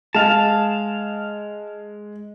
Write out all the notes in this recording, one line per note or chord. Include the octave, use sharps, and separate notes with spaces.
G#3 F5 A5